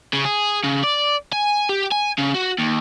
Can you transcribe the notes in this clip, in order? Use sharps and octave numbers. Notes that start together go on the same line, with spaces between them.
C#3
G#4
C#3
D5
G#5
G4
G#5
C#3
F#4
D#2